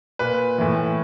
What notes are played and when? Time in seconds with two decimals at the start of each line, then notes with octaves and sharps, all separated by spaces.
0.19 A#2 B4
0.58 A2 E3